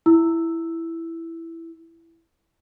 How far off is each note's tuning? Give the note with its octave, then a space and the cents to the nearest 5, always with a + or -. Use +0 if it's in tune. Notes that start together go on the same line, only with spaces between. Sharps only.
E4 +5 E6 +0